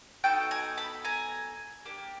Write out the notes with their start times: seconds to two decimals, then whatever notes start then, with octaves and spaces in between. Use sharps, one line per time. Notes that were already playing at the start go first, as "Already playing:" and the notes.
0.24 B3 D#4 F#4 A4 G5 A5
0.51 G#5 A#5
0.78 A5 B5
1.05 G#5 A#5
1.85 A#3 D4 G4